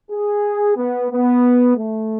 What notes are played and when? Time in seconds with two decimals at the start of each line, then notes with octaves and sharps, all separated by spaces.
0.10 G#4
0.77 B3
1.10 B3
1.77 A3